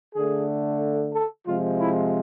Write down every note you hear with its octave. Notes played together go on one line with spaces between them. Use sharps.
D3 A3 G#4
A4
C3 F3 G#3 F4
E4